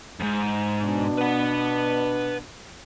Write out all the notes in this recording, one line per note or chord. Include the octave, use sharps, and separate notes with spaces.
F2 G#2
B2 D4
B4 F#5